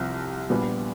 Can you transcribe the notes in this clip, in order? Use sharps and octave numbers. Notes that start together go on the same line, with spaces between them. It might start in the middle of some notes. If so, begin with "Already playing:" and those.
Already playing: C2 C3 F3 C4
A#1 A#2 G3 B3